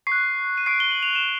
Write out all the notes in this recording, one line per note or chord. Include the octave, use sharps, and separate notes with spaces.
C#6 F#6 C7
D#7
C#6 F#6 C7 D7
G7
F#7
F7
E7